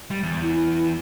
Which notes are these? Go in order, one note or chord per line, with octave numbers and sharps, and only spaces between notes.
G3
E2
E4
E4